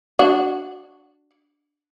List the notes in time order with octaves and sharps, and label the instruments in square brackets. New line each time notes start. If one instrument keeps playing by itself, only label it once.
[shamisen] D4 F#4